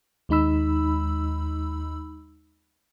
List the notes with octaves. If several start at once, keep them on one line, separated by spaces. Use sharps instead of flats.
D#2 G#3 D#4 B5 E6